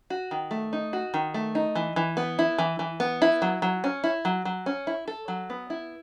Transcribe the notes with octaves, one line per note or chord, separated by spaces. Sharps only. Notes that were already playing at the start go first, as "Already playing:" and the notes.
F#4
D#3
A3
D#4
F#4
D#3
A3
D#4
E3
E3
B3
E4
E3
E3
B3
E4
F#3
F#3
C#4
E4
F#3
F#3
C#4
E4
A4
F#3
B3
E4